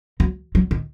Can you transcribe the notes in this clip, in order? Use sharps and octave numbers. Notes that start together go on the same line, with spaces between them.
F#3
F#3
D#3